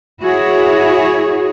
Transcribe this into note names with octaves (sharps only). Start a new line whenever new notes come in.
E4 F#4 G#4 C#5